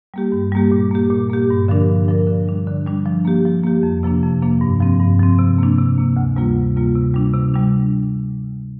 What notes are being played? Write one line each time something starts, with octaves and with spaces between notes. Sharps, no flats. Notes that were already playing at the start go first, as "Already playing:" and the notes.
G3 A#3 G4
G2
G3 A#3 G4
A#2
A#3 G4
A#2
A#3 G4
G2
D3 F3 D4 A#4
G2
D3 F3 D4 A#4
D3
G3 D4
D3
G3 D4
F3
A#3 G4
F3
A#3 G4
F2
C3 F3 A#3 D4
F2
C3 F3 A#3 D4
G2
F3 C4
G2
F3 C4
C3
A#3 D4
C3
A#3 D4
D2
C3 G3 A#3 F4
D2
C3 G3 A#3 F4
C3
G3 D4
C3
G3 D4